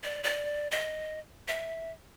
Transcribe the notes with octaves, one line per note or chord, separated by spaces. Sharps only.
D5
D5
D#5
E5